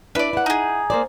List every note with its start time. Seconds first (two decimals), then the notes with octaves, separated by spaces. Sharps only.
0.15 D4 E4 B4 D5
0.33 E4 F#5
0.46 D#4 G#4
0.90 A#3 C5 D5